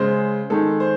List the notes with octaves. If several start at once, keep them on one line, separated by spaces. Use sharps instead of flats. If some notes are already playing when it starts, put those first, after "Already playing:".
Already playing: C#3 G#3 C5
D#3 G#3 A4
C5